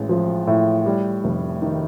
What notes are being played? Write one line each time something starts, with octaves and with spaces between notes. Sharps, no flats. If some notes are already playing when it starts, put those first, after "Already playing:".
Already playing: A1 G#3
F3
A2
G3
F1
D#3